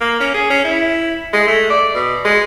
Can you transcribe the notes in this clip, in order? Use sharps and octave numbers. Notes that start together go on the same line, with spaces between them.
A#3
C#4
G#4
C#4
E4
G#3
A3
D5
B2
G#3